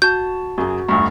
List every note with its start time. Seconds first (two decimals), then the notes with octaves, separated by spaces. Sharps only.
0.02 F#4 A5 G6
0.58 F#2 C#3 F#4 G#4
0.89 F1 D2 G2 C#6